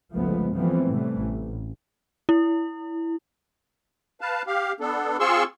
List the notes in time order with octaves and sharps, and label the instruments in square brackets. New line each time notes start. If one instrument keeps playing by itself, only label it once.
[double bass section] G1 C#2 F3 G#3 A3 B3
E3 F3 G3 A3 B3 C4
A2 C3 E3 G3 A3
A1
[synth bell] E4
[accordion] B4 F5 A5
G4 F5
B3 D4 A4
C4 F4 G#4 C6 C#6 E6